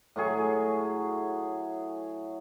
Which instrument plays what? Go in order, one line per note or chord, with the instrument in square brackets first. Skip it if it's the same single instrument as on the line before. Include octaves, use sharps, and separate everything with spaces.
[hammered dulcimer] A2 F#3 G#4 C#6